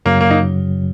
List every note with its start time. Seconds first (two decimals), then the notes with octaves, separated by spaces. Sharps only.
0.05 F#2 C#3 F#3 A#3
0.21 A#3
0.31 D#4